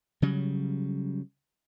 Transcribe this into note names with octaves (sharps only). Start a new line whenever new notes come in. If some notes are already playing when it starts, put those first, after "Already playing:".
C#3 F#3 G3